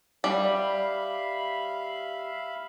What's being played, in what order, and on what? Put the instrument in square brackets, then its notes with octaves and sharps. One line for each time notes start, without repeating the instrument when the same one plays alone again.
[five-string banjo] G3 [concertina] E5 F5 B5